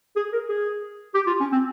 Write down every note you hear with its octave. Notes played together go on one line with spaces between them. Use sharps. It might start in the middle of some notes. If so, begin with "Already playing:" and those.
G#4
A#4
G#4
G4
F4
C#4
C4